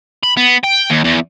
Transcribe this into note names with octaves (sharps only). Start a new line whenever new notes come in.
B5
B3
G5
D#2
E2